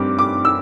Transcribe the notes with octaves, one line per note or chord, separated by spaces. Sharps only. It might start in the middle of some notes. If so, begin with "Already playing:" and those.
Already playing: G2 G3 C4 D6
D6
E6